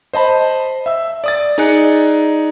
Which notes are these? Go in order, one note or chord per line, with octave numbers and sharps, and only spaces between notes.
C5 D#5 A5 B5
E5 E6
D5 D#6 A6
D#4 G#4 D5 F#6 C#7